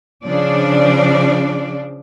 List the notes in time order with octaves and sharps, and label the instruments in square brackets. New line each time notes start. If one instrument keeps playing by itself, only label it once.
[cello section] C#3 F3 D4 D5